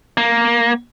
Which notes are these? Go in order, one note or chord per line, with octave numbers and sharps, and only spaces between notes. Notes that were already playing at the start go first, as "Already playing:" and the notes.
A#3